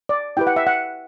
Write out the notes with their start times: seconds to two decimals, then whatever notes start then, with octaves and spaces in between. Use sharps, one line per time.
0.09 D5
0.37 E4 G4 B4 G5
0.47 F#5
0.56 E5
0.67 F#5